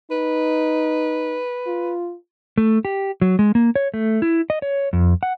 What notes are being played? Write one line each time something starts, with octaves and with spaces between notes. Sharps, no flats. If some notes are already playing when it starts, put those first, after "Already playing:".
D#4 B4
F4
A3
G4
F#3
G#3
A#3
C#5
A3
E4
D#5
C#5
F2
F#5